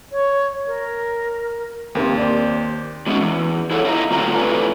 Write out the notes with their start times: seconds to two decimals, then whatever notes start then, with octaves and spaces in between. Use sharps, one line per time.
0.12 C#5
0.67 A#4
1.95 D#2 C3 A#3 C4
2.18 C5 D5
3.06 F#3 G#3 B3 C#4 D#4 F#4
3.21 E2
3.71 E4 G#4 A4 C#5 F#5
3.85 E4 F4 D#5 E5 G#5 A#5
4.11 A2 D3 F#3 C4 F4 A#5
4.34 A2 A3 D4 F4 B4 G#5